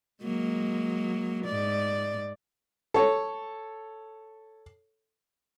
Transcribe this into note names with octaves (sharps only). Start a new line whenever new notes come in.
F#3 G#3 A#3
G#2 D5
A4 C#5